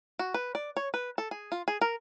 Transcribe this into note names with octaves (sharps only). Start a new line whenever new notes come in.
F#4
B4
D5
C#5
B4
A4
G#4
F4
G#4
A#4